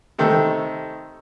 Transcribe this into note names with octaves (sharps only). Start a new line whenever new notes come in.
C3 D#3 A3 A4